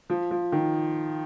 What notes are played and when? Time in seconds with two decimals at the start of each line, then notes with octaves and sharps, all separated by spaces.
0.10 F3
0.31 F3
0.52 D#3